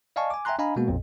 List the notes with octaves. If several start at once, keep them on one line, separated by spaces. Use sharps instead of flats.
D5 D#5 F5 G#5 A5 C#6
G#5 D6
E5 G5 G#5 A#5 C6 F#6
D4 D#5 F5 G#5 A#5 B5
B2 G#3 A#3 B3 F#4
A#1 F2 A#2